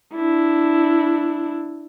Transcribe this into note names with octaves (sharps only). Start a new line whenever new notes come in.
D4 E4